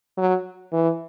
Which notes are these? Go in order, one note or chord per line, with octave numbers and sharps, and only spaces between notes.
F#3
E3